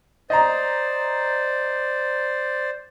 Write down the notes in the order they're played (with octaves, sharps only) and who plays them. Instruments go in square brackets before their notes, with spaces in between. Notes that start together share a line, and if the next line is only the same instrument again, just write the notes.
[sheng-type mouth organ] C5 D5 [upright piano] D#5 A#5